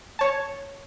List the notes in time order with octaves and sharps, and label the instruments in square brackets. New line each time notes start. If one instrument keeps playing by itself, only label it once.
[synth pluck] C#5 A5